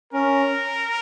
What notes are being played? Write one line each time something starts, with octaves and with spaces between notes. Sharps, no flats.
C#4 A#4